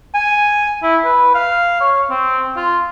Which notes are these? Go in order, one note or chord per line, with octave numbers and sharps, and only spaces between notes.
G#5
E4
B4
F5
C#5
C4
F4